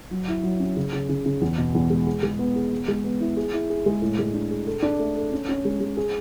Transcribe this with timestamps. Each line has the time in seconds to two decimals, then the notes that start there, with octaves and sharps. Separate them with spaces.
0.11 F#3
0.28 E4
0.43 F#3
0.60 C#4
0.76 C#3
0.93 C#3
1.09 C#3
1.26 C#3
1.41 E2
1.58 B2
1.75 E2
1.90 G#3
2.07 G#4
2.23 G#3
2.39 B3
2.56 G#4
2.71 B3
2.88 G#3
3.04 B3
3.21 E4
3.37 G#4
3.53 E4
3.70 G#4
3.86 G#3
4.02 A2
4.19 G#3
4.34 D4
4.51 G#4
4.66 A4
4.83 D4
4.99 A3
5.16 A4
5.32 C#4
5.49 C#4
5.65 G#3
5.80 G#3
5.97 G#4